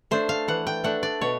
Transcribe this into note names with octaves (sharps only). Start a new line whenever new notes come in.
A3 D4 C5
F5
E3 F#5
G5
A3 D4 F#5
D5
B2 C#5